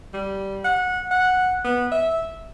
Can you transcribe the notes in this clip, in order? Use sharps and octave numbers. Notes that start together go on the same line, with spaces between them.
G3
F#5
F#5
B3
E5